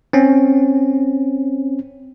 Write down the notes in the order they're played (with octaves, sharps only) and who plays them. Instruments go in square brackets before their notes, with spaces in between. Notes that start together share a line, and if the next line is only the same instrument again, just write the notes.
[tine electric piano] C4 C#4